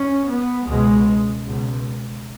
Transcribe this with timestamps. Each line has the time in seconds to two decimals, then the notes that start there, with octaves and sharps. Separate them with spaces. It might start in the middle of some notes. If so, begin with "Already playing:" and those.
Already playing: C#4
0.27 B3
0.66 C#2 B2 G#3
1.46 C#2 B2